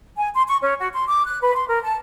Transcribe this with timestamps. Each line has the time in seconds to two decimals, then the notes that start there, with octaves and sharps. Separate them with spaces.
0.17 G#5
0.35 C6
0.49 C#6
0.61 C#4
0.79 F#4
0.93 C6
1.08 D6
1.27 F#6
1.41 B4
1.56 C6
1.68 A#4
1.83 A5